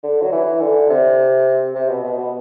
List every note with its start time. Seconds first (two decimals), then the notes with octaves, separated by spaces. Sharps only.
0.03 D3
0.22 F#3
0.32 E3
0.61 D3
0.89 C3
1.75 C3
1.89 B2
2.04 B2
2.18 B2